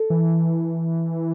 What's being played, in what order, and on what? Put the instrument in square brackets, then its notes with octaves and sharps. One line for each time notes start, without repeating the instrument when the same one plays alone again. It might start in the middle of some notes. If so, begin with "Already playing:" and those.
Already playing: [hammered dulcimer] A4
[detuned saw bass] E3